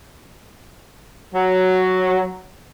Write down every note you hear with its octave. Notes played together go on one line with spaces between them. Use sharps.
F#3